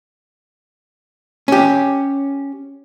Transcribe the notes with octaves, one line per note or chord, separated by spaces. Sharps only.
C#4 G4